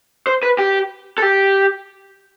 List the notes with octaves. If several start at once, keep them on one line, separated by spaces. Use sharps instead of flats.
C5
B4
G4
A4
G4